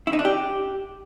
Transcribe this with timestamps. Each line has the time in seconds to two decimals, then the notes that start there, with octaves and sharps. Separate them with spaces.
0.07 E4
0.13 D#4
0.19 D4
0.25 G4